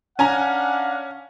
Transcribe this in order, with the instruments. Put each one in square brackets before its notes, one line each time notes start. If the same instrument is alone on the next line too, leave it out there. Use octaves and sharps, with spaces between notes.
[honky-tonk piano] C#4 G#5 A#5 [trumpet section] D4 F5 F#5